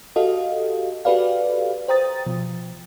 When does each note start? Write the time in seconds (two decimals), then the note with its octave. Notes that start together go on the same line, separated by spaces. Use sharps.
0.16 F#4 G4 A4 D#5 F5
1.05 F#4 G4 A4 B4 D5 F5
1.88 C5 G5 A#5 D#6 A6
2.26 B2 F3